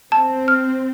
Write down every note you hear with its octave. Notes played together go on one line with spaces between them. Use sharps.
C4 A5
F6